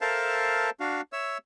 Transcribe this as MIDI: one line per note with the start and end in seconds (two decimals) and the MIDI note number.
0.01 0.70 69
0.01 0.70 70
0.01 0.70 72
0.01 0.70 76
0.01 0.70 77
0.01 0.70 81
0.80 1.01 62
0.80 1.01 66
0.80 1.01 77
1.13 1.38 73
1.13 1.38 76
1.13 1.38 88